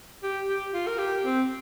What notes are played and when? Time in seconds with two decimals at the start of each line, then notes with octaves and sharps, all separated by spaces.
0.23 G4
0.48 G4
0.73 F4
0.87 A#4
0.98 G4
1.24 C4